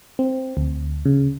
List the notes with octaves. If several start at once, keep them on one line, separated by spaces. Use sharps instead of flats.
C4
D2
C#3